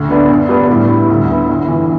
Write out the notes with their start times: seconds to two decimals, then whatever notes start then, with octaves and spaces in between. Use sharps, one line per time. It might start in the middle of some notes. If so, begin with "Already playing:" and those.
Already playing: D2
0.09 D3 B3 D4
0.29 G2
0.49 G3 B3 D4
0.69 A2
0.88 G3 E4
1.10 D2
1.29 D3 B3 E4
1.49 G1
1.68 G2 E3